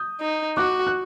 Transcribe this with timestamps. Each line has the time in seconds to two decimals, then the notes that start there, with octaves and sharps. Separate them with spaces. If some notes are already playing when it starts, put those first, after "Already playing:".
Already playing: D#6 G6
0.20 D#4
0.57 F#4 D6 F#6
0.87 F#6